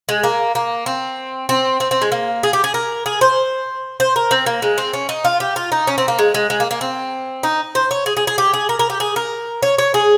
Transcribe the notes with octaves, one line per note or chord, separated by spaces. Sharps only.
G#3
A#3
A#3
C4
C4
C4
C4
G#3
A#3
G#4
G4
G#4
A#4
G#4
C5
C5
A#4
C4
A#3
G#3
C4
C#4
D#4
F4
G4
F4
D#4
C#4
C4
A#3
G#3
G#3
G#3
A#3
A#3
C4
D#4
C5
C#5
G#4
G#4
G#4
G4
G#4
A#4
A#4
G4
G#4
A#4
C#5
C#5
G#4